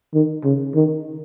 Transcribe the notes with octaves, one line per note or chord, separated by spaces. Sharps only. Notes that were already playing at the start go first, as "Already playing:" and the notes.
D#3
C#3
D#3